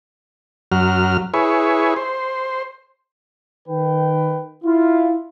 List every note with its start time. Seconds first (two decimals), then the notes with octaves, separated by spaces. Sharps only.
0.72 F#2 F#3 F6
1.34 E4 G#4 B4 C#5
1.96 C5
3.68 D#3 B4 G5
4.65 E4 F4